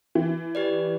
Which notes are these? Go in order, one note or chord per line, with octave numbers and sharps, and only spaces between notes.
E3
G4 B4 D5